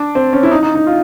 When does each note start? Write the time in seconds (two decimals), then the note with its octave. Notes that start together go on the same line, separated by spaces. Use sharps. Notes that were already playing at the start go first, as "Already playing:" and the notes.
Already playing: D4
0.15 C4
0.33 C#4
0.43 E4
0.51 D#4
0.63 D#4
0.75 D#4
0.87 F4